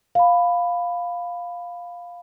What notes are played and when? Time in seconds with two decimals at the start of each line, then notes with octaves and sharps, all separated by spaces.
0.15 F5 B5